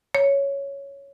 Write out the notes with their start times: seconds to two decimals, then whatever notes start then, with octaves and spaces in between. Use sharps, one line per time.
0.15 C#5